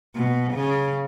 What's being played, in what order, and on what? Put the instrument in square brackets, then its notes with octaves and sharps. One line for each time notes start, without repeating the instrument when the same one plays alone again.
[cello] B2
C#3